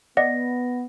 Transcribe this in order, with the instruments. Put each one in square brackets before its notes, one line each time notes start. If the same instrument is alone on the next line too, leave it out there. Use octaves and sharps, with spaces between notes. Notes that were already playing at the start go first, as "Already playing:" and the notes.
[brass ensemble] B3 [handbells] D5 D#5 F#5 [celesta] A#6